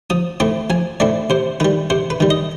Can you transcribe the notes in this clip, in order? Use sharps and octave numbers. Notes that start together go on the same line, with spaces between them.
F3 D#6
A3 C4 E4 D6
F3 G#5
A3 C4 E4 D5
C3 C5
D#3 G3 B4
C3 C5
B4
D#3 G3
D#5